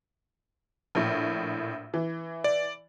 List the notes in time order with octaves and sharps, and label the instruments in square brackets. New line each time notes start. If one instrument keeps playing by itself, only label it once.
[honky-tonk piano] A#1 A2
E3
[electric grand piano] D5